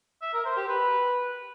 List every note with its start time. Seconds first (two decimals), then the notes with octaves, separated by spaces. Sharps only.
0.22 E5
0.34 A#4
0.45 C5
0.57 G4
0.69 B4